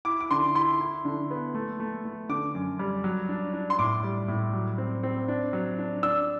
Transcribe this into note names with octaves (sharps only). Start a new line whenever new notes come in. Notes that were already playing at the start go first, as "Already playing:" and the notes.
E4 D6
D6
D3 C6
E4 C6
E4
D3
B3
A3
A3
A3
D3 D6
F#2
G3
F#3
D4
D4
C6
A2 D6
G3
A2
F#3
C4
C4
D4
F#3
D4
D4 E6